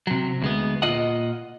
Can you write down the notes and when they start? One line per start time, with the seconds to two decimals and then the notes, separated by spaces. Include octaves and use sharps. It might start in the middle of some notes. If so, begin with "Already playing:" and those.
0.07 C3 F#3
0.42 D2 G#3 B3
0.82 A#2 F4 D#5 F#5